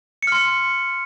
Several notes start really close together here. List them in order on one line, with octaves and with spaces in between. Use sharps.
C#7 F6 C6